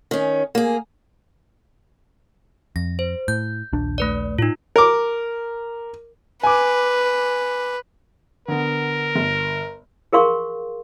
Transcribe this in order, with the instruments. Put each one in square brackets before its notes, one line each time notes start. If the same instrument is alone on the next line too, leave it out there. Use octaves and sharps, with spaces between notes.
[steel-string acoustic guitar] D#3 C#4
A#3 G#4
[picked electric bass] F2 [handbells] A#6
[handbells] C5
[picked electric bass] A2 [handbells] G6
[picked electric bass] A#1 D#2 D4
[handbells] A3 B4 D5
[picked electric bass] A2 [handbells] D#4 F4
[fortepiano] A#4 D6
[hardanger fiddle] B4 [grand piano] G#5 D6
[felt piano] D3 B3 [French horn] A#4
[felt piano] G1
[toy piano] G#4 A#4 F5 C6 C#6